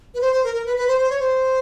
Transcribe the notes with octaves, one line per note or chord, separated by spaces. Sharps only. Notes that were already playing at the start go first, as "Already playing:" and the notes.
B4
C5
C5
A#4
A#4
B4
B4
C5
C5
C#5
C5